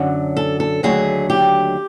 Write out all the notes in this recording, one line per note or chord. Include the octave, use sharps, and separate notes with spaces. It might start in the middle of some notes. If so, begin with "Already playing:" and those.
Already playing: F#2 D3 F#3
A4
A4
D#2 D3 F#3 A3 G#4
G4